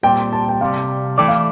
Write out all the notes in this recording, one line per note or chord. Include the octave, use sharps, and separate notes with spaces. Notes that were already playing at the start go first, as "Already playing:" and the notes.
A#2 G3 C4 G5
A5
G5
C2 C3 G3 F5
E3 A3 E4 A4 D5 G5
F5